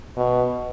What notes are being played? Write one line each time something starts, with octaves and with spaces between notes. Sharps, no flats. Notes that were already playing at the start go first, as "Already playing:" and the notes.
B2